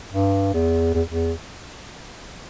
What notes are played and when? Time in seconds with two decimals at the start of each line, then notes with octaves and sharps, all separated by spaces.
0.12 G2
0.54 E2
0.94 E2
1.10 E2